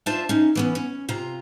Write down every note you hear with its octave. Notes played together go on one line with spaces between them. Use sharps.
D4 F4 C5 E5 A5
C#4 D#4
E3 B3 C#4
C#4
C3 F4 A#5